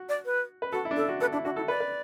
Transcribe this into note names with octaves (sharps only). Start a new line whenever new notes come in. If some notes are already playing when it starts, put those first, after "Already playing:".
Already playing: F#4
D5
B4
B4
F#4 A4
E4
D4
E4 A4
F#4
A4 B4
D4 E4
D4 F#4
E4 A4
B4 D5
B4